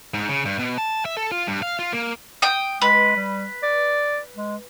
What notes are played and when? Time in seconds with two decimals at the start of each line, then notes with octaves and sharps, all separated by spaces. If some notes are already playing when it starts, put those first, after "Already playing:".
0.14 G#2
0.29 C#3
0.45 G2
0.59 B2
0.78 A5
1.05 E5
1.17 A4
1.32 F4
1.47 G2
1.62 F5
1.79 F4
1.93 A#3
2.42 G5 D#6
2.81 G#3 B4
3.16 G3
3.63 D5
4.36 G#3